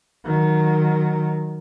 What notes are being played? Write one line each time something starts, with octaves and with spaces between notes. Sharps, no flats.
D#3 F#3